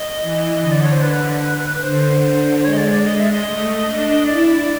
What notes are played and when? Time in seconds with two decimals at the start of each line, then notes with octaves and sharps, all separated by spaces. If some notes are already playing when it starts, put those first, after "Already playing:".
Already playing: D#5
0.21 E3
0.62 D3 D#5
0.71 D5
0.83 C#5
0.92 C5
1.02 B4
1.83 D3 C5
2.24 D3
2.60 C5
2.65 G#3 C#5
2.73 D#5
2.77 D5
2.91 D5
3.05 D#5
3.19 E5
3.32 D#5
3.45 A3
3.86 D4
4.26 E4 D5
4.47 D5